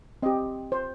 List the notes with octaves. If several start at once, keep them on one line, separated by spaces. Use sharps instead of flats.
C4 G4 D#5
C5